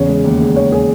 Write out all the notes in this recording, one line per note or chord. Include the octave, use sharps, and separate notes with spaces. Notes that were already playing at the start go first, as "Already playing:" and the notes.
Already playing: E2 C#3 C#5
G#3
D#2
G#3
D#2 C#5
G#4